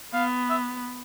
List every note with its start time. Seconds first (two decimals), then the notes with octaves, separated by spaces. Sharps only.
0.14 B3 F5
0.50 E5